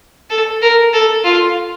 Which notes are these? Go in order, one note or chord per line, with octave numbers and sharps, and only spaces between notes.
A4
A#4
A4
F4